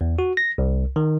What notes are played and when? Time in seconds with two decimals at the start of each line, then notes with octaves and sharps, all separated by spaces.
0.01 E2
0.19 F#4
0.37 A#6
0.58 C2
0.96 D#3